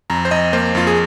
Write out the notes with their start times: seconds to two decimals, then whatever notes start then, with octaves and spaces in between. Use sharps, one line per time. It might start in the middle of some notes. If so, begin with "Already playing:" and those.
0.10 F2 A#5
0.25 C5
0.31 F2 D#5
0.53 A#3 C5
0.75 F2 F4
0.87 G#4